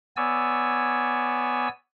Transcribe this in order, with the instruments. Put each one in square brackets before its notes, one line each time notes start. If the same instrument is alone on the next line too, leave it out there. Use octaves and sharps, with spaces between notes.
[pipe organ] B3 C#5 D5 G#5 E6